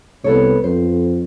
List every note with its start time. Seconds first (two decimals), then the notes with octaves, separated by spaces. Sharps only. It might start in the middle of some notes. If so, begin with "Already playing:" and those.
0.24 C2 B3 A4 C#5
0.64 F2 C5